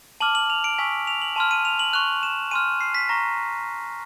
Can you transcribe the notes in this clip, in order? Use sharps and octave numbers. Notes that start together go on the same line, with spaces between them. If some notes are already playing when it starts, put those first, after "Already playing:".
A5 D6 F6 F#7
F#7
F7
D7
G#5 C#6 E6 B6
F7
F#7
A5 C6 F6 E7
D#7
F7
F#7
C#6 F#6 F7
E7
G#5 C6 F6 D#7
C7
B6
A#5 C#6 F6 A#6